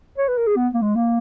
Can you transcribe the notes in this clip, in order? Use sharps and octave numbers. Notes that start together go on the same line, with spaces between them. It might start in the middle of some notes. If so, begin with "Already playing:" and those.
C#5
B4
A#4
G#4
B3
A#3
G#3
A#3